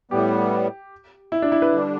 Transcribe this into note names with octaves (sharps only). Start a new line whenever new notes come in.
A2 G3 B3 G4
E4
D4
E4
B4
D3 G3 D4